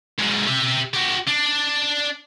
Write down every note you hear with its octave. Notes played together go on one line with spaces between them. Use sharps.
G#2 F#3
G4 E5
F#4 G4
D4